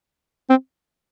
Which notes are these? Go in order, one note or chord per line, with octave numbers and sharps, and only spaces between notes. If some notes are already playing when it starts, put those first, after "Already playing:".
C4